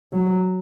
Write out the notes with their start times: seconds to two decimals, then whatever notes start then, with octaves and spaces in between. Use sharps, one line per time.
0.13 F#3